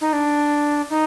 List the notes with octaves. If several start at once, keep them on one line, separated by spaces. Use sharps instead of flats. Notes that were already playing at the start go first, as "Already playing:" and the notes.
D#4
D4
D#4